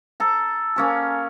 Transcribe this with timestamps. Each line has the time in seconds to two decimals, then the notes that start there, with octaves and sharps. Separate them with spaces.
0.20 A4 A#5
0.76 A#3 C#4 G#4